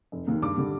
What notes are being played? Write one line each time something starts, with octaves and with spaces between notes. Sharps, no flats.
F1
D#2 D#3 A#3
G2 D6
D3 G3